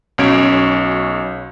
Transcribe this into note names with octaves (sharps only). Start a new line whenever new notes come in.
B1 C#4 F#4 G#6 D7